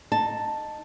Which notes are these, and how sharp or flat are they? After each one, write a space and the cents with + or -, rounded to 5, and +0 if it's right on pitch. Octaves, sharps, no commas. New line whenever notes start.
D#4 -15 A5 +0